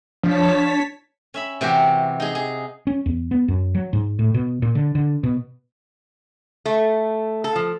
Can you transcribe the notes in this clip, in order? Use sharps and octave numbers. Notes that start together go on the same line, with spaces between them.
F3 D4 C#5 A5 B6
C#4 E5 B5
C3 E3 F#4 G4
D#4 G#4
G#4
C#4
E2
B3
F#2
F#3
G#2
A2
B2
A#2
D3
D3
B2
A3
A4
F3